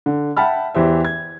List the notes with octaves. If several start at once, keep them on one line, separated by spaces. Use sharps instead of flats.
D3
E5 F#5 G5 A5 B5 F6
E2 E3 G4 C5 E5
G#6